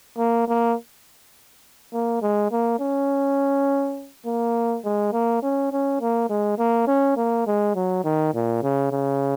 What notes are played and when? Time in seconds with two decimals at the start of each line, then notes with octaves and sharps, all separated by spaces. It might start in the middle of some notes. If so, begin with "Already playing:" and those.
0.18 A#3
0.48 A#3
1.93 A#3
2.22 G#3
2.51 A#3
2.80 C#4
4.26 A#3
4.85 G#3
5.13 A#3
5.43 C#4
5.72 C#4
6.01 A#3
6.30 G#3
6.58 A#3
6.88 C#4
7.17 A#3
7.47 G#3
7.75 F#3
8.04 D#3
8.34 A#2
8.63 C#3
8.91 C#3